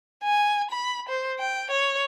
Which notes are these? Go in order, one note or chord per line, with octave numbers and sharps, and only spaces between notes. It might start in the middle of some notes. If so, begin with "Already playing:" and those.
G#5
B5
C5
G5
C#5